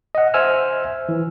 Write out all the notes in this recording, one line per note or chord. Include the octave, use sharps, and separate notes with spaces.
D#5 F#5
C5 E5 G#5 E6 F6
E3